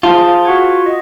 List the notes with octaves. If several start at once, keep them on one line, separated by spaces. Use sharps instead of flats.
F4 G#4 C5 A5
F#4 F#5 G#6
D#5